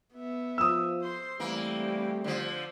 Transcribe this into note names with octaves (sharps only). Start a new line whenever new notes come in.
B3 E5
F3 D#6 E6
C5 C6
E3 G3 A3 A#3 C4 G4
D3 F3 C5